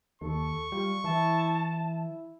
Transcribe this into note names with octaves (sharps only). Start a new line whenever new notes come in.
D#2 A4 C#6
G3 F4
E3 E4 A5
E4